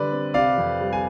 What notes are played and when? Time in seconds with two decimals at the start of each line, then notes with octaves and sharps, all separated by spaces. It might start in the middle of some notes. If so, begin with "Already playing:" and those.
Already playing: D3 G3 B4 D5
0.11 C4
0.34 C3 D5 F5
0.58 F2
0.80 G3
0.93 G#5